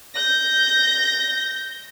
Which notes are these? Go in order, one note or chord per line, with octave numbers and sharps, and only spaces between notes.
G6 A#6